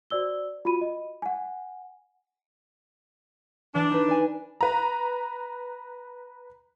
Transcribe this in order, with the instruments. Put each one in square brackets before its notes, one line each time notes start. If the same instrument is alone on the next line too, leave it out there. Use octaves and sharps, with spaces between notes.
[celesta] F#4 C5 D5 E6 G7
F4 F#4 B5 D#7
D#5
F#5 G#5
[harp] E3 [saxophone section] D4
[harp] D#4 B4
D5 G#5
[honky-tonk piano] B4 A#5